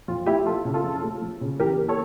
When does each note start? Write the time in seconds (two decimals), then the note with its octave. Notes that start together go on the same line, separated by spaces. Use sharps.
0.08 F2 F4
0.26 A3 E4 G4
0.46 F3 F4 A4
0.65 C#3
0.74 F4 A4
0.84 F2
1.04 A3
1.22 F3
1.41 C#3
1.60 E2 G4 A#4
1.79 A#3
1.89 A4 C#5